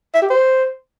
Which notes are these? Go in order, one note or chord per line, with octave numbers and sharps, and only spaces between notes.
E5
G4
C5